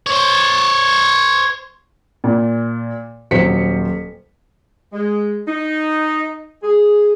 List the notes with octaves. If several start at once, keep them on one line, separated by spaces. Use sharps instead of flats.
C5 C#5
A#2
D#1 F#3 C5 B6 C#7
G#3
D#4
G#4